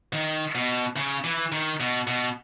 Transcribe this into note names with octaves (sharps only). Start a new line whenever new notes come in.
D#3
B2
C#3
E3
D#3
B2
B2